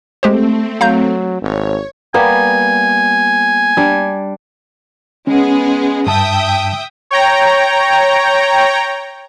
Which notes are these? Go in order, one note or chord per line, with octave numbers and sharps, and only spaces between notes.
G#3 A3 C4 G4 C5
F#3 F5 A#5 G6
G#1 C#5
G3 A#3 B3 G#5
G3 D4
G#3 B3 C#4 G#4
G2 E5 G5 A5 D#6
C#5 G5 A#5